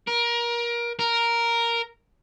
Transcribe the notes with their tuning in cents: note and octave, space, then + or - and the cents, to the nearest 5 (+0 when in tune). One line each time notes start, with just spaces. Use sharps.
A#4 +25
A#4 +0